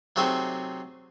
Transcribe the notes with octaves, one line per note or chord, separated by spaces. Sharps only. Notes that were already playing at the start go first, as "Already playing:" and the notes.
C3 F#3 A3 C4 D#4 G#4